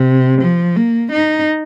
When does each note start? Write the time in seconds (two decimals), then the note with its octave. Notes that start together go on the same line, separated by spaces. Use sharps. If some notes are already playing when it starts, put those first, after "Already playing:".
Already playing: C3
0.42 F3
0.76 A#3
1.12 D#4